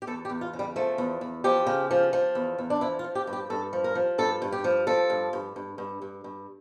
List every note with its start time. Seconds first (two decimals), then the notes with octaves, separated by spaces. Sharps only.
0.02 G4
0.07 E2 A4
0.25 G4
0.30 E2
0.41 F4
0.53 C#3
0.59 G3
0.76 F3 A3
0.98 E2
1.21 E2
1.44 F3 G4
1.67 C#3
1.91 F3
2.13 F3
2.35 E2
2.58 E2
2.70 D4
2.81 F3 E4
2.99 F4
3.04 F3
3.15 G4
3.27 G2
3.33 G4
3.50 G2 A4
3.73 F3
3.84 A#4
3.95 F3
4.18 G2 A4
4.42 G2
4.52 G4
4.64 F3
4.87 F3 A4
5.10 G2
5.33 G2
5.56 G2
5.78 G2
6.02 G2
6.24 G2